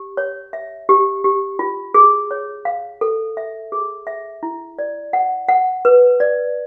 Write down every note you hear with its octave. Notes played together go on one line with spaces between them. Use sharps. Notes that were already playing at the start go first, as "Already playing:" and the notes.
Already playing: G4
C#5
E5
G4
G4
F4
G#4
C#5
F5
A4
E5
G#4
E5
E4
D5
F#5
F#5
B4
D5